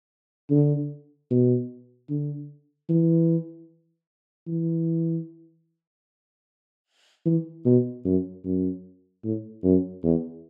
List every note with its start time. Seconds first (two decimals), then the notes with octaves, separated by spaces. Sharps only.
0.51 D3
1.30 B2
2.10 D3
2.89 E3
4.47 E3
7.25 E3
7.65 B2
8.05 F#2
8.45 F#2
9.24 A2
9.64 F#2
10.03 E2